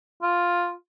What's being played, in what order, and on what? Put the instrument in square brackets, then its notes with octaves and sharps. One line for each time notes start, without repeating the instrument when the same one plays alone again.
[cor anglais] F4